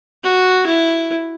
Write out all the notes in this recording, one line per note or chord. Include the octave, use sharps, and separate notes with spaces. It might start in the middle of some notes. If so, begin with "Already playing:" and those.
F#4
E4